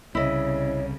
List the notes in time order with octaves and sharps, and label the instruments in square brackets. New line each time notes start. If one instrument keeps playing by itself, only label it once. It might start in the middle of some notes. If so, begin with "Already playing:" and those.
[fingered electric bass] C2 [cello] C#3 [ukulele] E4 D#5 [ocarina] C#5